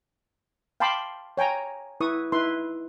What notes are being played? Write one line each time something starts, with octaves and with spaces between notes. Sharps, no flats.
F5 G5 A5 B5 C6 D6
C#5 G5 G#5 A#5
E4 B4 C#6 D#6
D#4 E4 B4 C6